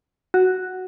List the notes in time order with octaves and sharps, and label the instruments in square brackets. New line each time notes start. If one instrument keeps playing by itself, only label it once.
[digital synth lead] F#4